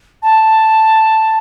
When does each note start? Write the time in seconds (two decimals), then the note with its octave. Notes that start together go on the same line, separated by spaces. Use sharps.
0.23 A5